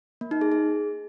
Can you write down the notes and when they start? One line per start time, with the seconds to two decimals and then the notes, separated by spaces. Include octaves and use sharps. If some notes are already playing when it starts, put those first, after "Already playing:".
0.21 A#3
0.31 D#4
0.41 G#4
0.52 G#4